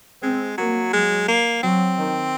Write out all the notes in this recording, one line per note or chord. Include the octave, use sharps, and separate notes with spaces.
G#3 C4
F#3 A#3
F#3 G#3
A#3
F#3 C4
D#3